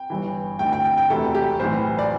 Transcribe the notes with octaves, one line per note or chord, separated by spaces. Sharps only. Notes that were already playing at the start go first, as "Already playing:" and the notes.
Already playing: G5
G1 G2 E3
D2 D3 G5
G5
G5
G5
E1 D2 C3 E3 A4
G4
B1 A2 E3 C5
D5